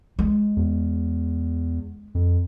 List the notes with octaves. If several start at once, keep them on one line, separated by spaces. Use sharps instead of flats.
G#3
E2
F2